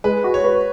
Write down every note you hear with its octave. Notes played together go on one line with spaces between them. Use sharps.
G#3 B4
F#4
C#5
B4